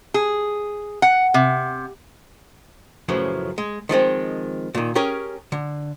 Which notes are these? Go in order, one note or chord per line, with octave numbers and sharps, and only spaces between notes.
G#4
F#5
C3
F#2 A2 C#3 E3 F3
G#3
D#3 F3 G#3 C4
A#2 D#3
C#4 G4 G#4 A#4 C#5
D3